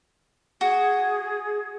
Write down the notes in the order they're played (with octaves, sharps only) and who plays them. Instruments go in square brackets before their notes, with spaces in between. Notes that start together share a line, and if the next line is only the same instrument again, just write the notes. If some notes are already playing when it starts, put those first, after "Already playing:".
[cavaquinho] F#4 [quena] G#4